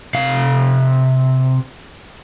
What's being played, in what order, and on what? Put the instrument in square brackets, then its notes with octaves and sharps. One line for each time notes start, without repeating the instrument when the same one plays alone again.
[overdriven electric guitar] C3 F5